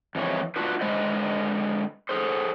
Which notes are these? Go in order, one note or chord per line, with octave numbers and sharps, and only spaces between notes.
F2 E3 G#3 C#5
D4 F4 F#4 B4
D3 G#3 B4 C5 D#5
G#4 A4 C5